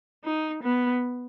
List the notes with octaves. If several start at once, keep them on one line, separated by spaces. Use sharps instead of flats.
D#4
B3